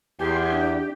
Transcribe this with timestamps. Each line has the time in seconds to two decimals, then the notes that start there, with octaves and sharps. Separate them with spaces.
0.19 E2 G4 G5 G#5 C6
0.52 D4